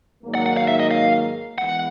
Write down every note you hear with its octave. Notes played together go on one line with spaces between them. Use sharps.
G#2 D#3 F#3 A#3
F#5
F#5
F5
E5
D#5
F5
E3 G#3 B3 F#5